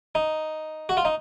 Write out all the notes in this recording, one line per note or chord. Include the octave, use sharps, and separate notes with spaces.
D#4
F#4
F4
D#4